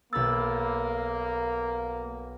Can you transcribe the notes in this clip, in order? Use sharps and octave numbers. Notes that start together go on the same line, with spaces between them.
B1 A#3 B5 E6 A6